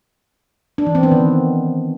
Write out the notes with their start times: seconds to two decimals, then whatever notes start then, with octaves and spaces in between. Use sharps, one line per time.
0.78 D4
0.87 E3
0.95 C4
1.03 B3
1.11 D#3